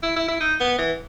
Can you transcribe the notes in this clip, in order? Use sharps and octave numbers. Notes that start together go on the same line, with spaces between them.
E4
E4
E4
D#4
B3
E3